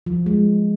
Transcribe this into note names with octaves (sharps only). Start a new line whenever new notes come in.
F3
G#3